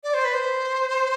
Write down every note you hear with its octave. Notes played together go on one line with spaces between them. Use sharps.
D5
C5
B4
C5